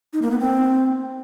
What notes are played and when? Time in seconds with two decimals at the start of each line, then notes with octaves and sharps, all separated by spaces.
0.13 D#4
0.22 A#3
0.31 B3
0.40 C4